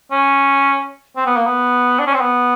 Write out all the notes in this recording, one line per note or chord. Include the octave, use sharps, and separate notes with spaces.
C#4
C4
B3
A#3
B3
D4
C#4
C4
B3